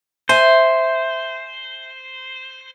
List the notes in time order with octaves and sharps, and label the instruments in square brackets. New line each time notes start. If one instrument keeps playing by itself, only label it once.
[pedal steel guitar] C5 [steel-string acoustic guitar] E5 G#5